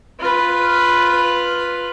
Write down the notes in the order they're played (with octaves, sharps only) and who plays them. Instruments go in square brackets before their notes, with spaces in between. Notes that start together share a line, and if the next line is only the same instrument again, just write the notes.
[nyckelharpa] F4 B4